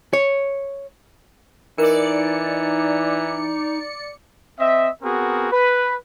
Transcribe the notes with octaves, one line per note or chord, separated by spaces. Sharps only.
C#5
E3 D#4 A#4 D5 C#7
C4 D#5 E5
B3 C4 F#4 G#4 A#4
B4